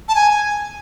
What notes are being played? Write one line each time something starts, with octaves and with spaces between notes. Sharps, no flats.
A5
G#5